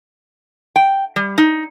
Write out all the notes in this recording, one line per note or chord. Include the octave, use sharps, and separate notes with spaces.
G5
G3
D#4